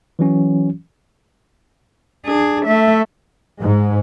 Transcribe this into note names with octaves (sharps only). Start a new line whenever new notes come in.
E3 F#3 C#4 F#4
D4 G#4
A3 E5
G#2